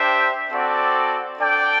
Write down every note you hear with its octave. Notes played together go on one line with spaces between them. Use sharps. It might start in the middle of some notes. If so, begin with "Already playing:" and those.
Already playing: D4 G4 C5 E5 G5
C4 F#4 A4 D5
D4 A4 D5 G5